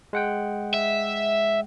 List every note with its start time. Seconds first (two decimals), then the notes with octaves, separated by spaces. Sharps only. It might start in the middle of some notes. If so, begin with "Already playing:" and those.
0.13 G#3 F#5 G5
0.74 E5